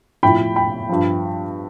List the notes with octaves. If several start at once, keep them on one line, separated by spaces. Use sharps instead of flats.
A2 F3 G5 B5
G5 B5
G2 F3